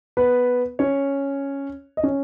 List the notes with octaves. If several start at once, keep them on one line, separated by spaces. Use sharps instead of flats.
B3 B4
C#4 C#5
D#5
C#4 C#5